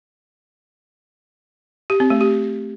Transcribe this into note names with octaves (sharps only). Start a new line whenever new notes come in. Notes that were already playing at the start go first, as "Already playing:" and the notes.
G4
C4
A3
G4